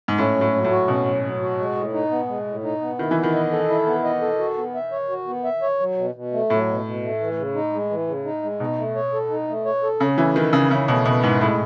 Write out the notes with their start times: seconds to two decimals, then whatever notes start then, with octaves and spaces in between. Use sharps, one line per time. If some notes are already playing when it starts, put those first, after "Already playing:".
0.08 G#2
0.18 A2 C#4
0.36 F#3
0.41 A2
0.53 F#3
0.65 A2
0.70 F#4
0.88 B2 C#4
1.06 F#3
1.23 F#3
1.41 F#4
1.58 G#3
1.76 A2
1.93 D#4
2.11 B3
2.29 G#3
2.47 A2
2.64 D#4
2.81 B3
2.99 D#3 E4
3.11 E3
3.16 B3
3.24 D#3
3.34 D#5
3.51 A4
3.69 E4
3.86 B3
4.04 D#5
4.21 A4
4.39 F#4
4.57 B3
4.75 E5
4.92 C#5
5.09 F#4
5.27 B3
5.44 E5
5.62 C#5
5.80 F#3
5.97 B2
6.15 B2
6.32 A3
6.50 A2 F#3
6.67 B2
6.85 B2
7.02 A3
7.20 E3
7.37 C#3
7.55 D#4
7.73 G#3
7.90 E3
8.07 C#3
8.25 D#4
8.43 G#3
8.60 B2 D#4
8.78 A3
8.95 C#5
9.13 A4
9.30 D#4
9.48 A3
9.65 C#5
9.83 A4
10.00 C#3 C#4
10.18 E3 A3
10.35 D#3 B4
10.53 C#3 E4
10.71 C#3 C#4
10.88 B2 A3
11.05 B2 B4
11.23 G#2 E4
11.41 A2 G#3